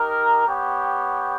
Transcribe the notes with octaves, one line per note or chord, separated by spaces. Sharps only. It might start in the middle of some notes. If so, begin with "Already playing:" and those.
Already playing: D#4 G4 A#4
B3 G4 C#5 G5